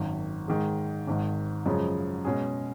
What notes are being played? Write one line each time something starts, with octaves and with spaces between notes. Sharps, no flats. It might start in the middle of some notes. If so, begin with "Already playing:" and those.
Already playing: G#1 F#2 D#3
G#2 D#3 G#3
G#1 G#2 D#3
F#2 C#3 F3 G#3
B2 G#3 C#4 G#4